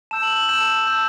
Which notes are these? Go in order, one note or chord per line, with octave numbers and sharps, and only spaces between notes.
A5 E6 G6 E7
F#7
F#7
A5 E6 G6 E7
A5 E6 G6